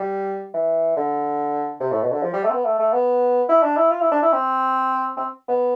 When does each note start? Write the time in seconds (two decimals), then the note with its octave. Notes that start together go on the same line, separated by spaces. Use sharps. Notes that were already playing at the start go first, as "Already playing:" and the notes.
Already playing: G3
0.54 E3
0.97 D3
1.80 C3
1.92 A2
2.02 B2
2.12 D3
2.23 F3
2.33 G3
2.44 A3
2.50 C4
2.54 B3
2.65 A3
2.79 A3
2.93 B3
3.49 E4
3.63 D4
3.77 E4
3.91 F4
4.01 E4
4.12 D4
4.22 E4
4.33 C4
5.17 C4
5.48 B3